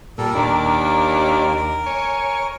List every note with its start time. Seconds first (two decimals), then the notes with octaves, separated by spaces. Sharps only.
0.18 A#2 G3 A4
0.35 D#2 D4 A#4
1.86 C#5 G#5